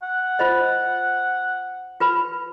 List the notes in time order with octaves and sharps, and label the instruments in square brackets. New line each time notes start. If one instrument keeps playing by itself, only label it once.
[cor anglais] F#5
[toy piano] F4 C5 D#5
F4 B4 B5